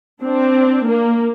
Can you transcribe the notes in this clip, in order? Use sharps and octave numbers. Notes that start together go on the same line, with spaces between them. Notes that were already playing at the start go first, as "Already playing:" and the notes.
C4 D4
A#3